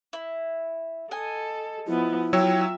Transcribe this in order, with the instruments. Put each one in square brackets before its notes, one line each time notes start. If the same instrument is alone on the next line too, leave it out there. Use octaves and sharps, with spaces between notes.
[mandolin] E4
[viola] A4 [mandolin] D#5 G#5
[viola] F3 B3 [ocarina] E4
[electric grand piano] F#3 C#5 E6 [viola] F4 E5 [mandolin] G4